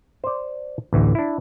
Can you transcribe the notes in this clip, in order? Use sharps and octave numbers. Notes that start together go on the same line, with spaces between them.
C5 D5
A1 D2 E3
D4 E4